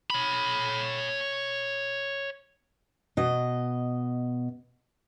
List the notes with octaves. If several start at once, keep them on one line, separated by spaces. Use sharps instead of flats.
C#5 B5
B2 D#5